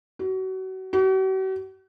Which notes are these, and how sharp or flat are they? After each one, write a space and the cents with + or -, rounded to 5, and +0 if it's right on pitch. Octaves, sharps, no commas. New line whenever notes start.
F#4 +30
F#4 +45